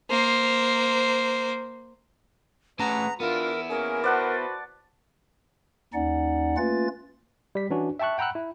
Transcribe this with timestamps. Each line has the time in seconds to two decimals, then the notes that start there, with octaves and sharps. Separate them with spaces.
0.10 A#3 C5
2.79 A3 C#4 G#4 B4 F#5 A5 A#5
3.20 B3 D4 E4 F4 A#4
3.70 A#3 C#4 G#4 A#4
4.04 F#4 B4 C5 D5 F#5 A5
5.94 D#2 C#4 D#4 D5 F#5
6.57 A3 A#3 C#4 F4 B4 A6
7.55 G3 B6
7.70 E3 C#4 D4 F#4
7.99 E5 G5 A5 C#6 F#6
8.18 F#5 G5 A#5 B5 E6 F#6
8.35 E4